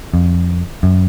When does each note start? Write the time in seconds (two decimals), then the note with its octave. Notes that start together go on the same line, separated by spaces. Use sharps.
0.14 F2
0.83 F#2